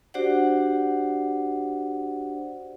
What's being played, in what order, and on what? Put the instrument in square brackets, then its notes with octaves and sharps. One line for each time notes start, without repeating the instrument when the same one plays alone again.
[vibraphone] D4 F#4 G4 C5 D5 F#5